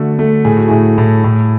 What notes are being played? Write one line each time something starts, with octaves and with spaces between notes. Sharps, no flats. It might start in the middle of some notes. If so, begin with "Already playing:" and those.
Already playing: D3 A3 F#4
A3
A2 G#4
F#4
A2 E4 G#4
A2
A2